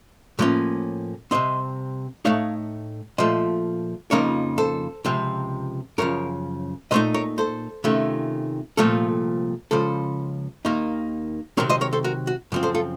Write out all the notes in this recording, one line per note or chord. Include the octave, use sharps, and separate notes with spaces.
A2 F3 A#3 C#4
C2 C3 F3 C4 C5 D#5
A2 A3 D#4 C#5 F5
A#2 F3 A3 C5 D#5
F2 C#3 F3 A#3 D#4 A#4 C#5
A4 C5
C#2 C3 F3 C4
F#2 C#3 F3 A#4 C#5
A#2 A3 D#4 C5 D#5
A#4 C#5
A4 C5
C3 D#3 A3 C#4 F4
C2 A#2 F3 A3 C4 F4 A4
C#2 C#3 F3 A4 C5
D#2 D#3 A#3 D#4
C3 D#3 F#3 C4 A#4 C#5
C5 D#5
A#4 C#5
A4 C5
F#4 A#4
F#4
F#2 C#3 F3 C4
A4 C5
F4 A4